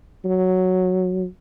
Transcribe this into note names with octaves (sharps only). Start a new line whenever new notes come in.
F#3